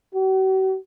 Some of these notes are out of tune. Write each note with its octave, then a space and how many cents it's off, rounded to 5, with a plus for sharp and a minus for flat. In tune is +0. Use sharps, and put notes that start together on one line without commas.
F#4 +45